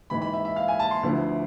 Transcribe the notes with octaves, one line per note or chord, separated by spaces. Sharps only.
G#1 G#2 E3 B5
B5
E5
E5
F5
G#5
A5
C6
D2 D3 F3 B3 E4